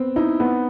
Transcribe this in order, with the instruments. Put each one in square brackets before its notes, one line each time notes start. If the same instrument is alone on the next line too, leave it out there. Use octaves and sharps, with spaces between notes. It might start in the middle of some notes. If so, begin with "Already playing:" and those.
Already playing: [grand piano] B3 C4
[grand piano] D#4 [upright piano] E4
[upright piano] B3